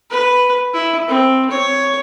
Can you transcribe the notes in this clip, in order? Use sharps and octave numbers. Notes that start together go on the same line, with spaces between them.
B4
E4
C4
C#5